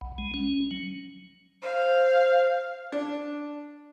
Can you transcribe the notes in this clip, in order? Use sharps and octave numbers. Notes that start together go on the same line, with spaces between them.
B1
G#3
C#4
F#3
C5 F5
D4